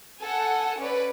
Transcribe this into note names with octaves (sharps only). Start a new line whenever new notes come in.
A4 F#5 G#5
C#4 B4 D5